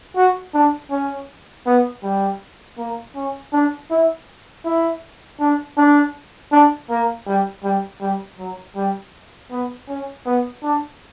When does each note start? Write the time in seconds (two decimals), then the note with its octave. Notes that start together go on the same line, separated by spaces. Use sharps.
0.16 F#4
0.54 D4
0.91 C#4
1.66 B3
2.03 G3
2.78 A#3
3.16 C#4
3.53 D4
3.91 E4
4.65 E4
5.40 D4
5.77 D4
6.52 D4
6.90 A#3
7.26 G3
7.64 G3
8.01 G3
8.39 F#3
8.76 G3
9.51 B3
9.88 C#4
10.26 B3
10.63 D4